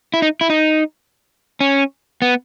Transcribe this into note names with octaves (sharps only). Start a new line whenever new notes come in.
E4
D#4
E4
D#4
C#4
B3